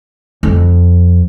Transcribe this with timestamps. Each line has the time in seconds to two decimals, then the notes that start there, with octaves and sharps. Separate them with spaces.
0.43 F2